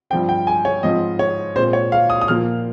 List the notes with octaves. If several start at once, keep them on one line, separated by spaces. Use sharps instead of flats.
G2 F3 C4 G5
G5
G#5
C#5
G#2 F3 C4 D#5
C#5
A#2 G#3 C4 C5
C#5
F5
D#6
D#6
A#2 F3 A#3 F6